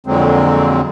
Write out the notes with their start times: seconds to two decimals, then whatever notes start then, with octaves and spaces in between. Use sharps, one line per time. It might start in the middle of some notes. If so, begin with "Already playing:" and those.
0.07 F2 A#2 D3 F#3 G#3 C4